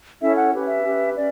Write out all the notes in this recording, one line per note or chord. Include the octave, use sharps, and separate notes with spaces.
C#4 E4 A4 C#5 E5
F#5
C#4 G4 B4
E5
C#4 G4 B4
C#4 D5